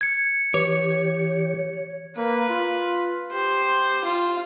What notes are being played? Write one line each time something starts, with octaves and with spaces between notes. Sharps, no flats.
G#6 C#7
E3 G4 C#5
A#3 B4
F4
G4 C5
F4